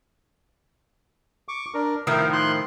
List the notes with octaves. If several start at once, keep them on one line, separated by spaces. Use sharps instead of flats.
C#6 D6
D4 A#4
A2 D#3 F3 E4 A#4
C6 F#6